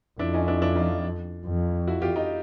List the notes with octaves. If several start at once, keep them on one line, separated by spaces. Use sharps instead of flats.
F2 D4 E4
C#4 D#4
D4 E4
D4 E4
D#4 F4
F2
E4 F#4
F4 G4
D#4 F4